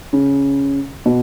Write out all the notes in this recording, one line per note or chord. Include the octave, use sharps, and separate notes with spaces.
C#3
B2